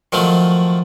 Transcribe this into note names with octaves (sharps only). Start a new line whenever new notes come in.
D#3 F3 F#3 A3